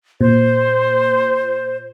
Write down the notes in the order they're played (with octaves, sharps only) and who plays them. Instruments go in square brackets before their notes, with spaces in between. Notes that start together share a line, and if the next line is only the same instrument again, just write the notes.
[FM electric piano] A#2 [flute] C5